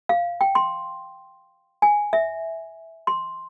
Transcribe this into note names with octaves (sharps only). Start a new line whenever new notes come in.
F5
G5
C6
G#5
E5
C6